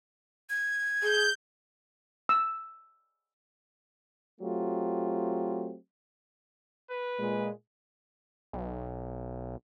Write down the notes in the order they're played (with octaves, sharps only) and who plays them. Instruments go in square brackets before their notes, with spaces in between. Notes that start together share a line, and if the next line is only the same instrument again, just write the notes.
[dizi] G#6
[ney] G#4 [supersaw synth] G6
[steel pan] E6
[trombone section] F#3 A3 C4 F4 G4
[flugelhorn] B4
[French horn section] A#2 G#3
[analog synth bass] B1